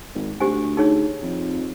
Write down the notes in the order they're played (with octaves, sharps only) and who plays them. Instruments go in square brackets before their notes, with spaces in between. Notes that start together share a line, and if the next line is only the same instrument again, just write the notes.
[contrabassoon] G#1
[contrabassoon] D2 [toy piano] G4 C5 G#5
[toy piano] D#4 G#4 C#5
[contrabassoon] F2